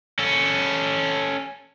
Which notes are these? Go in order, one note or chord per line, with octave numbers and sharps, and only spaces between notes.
C#4 A4